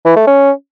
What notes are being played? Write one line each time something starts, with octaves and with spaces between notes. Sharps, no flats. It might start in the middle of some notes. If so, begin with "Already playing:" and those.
E3
A3
C#4